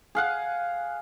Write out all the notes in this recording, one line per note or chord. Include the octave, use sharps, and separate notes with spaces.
G#4 F5 F#5